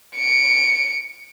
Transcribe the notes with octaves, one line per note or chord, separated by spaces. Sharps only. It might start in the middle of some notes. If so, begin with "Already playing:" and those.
C#7 D7